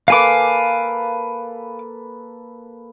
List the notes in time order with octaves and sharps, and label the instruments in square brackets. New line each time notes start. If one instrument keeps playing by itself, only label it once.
[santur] A#3 A4 B4 [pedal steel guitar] F5 G#5 D6